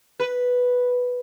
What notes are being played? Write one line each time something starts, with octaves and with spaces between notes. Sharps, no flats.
B4